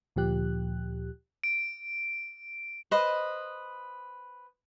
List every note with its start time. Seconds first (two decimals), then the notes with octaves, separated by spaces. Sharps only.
0.16 D2 A#2 F3 G4 F#6
1.44 D7
2.91 B4 C5 D#5